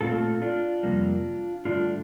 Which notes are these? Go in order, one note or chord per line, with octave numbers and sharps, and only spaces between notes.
A#2 A3 C4 F4 A4
D4 F4
F2 C3 G3 A#3
G2 D3 A3 D4 F4